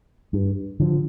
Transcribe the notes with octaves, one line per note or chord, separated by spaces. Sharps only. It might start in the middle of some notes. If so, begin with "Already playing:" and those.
G2
D3 F3